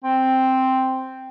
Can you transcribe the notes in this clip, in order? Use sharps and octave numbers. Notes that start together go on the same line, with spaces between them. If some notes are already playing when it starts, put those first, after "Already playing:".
C4